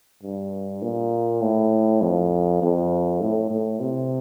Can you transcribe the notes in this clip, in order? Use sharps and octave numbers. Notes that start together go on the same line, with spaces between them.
G2
A#2
A2
F2
F2
A2
A2
C3